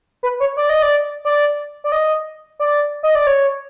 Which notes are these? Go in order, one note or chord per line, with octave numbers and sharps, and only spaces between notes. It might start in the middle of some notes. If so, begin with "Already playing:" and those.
B4
C#5
D5
D#5
D5
D5
D5
D#5
D5
D#5
D5
C#5